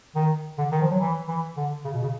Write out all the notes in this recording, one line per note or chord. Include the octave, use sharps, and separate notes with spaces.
D#3
D3
D#3
F3
F#3
E3
E3
D3
C#3
B2
C#3